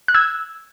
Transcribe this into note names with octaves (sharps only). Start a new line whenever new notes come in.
F#6
E6 G#6